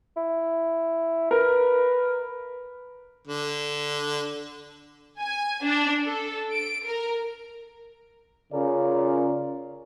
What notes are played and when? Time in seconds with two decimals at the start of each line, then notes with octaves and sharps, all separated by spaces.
0.17 E4
1.31 A#4 B4
3.27 D3
5.20 G#5
5.64 D4
6.04 A4
6.54 D7
6.86 A#4
8.53 C#3 C#4 F4 A#4 D5